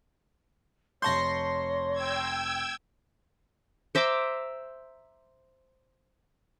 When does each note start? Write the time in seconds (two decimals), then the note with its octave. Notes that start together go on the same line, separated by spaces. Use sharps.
1.02 F1 C#5 A5 C6 C#6 G6 A#6
1.92 G5 E6 G#6
3.95 C5 E5 A#5 D6